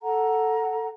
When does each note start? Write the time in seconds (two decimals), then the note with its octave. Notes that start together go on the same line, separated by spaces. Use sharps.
0.02 A4 F#5 A#5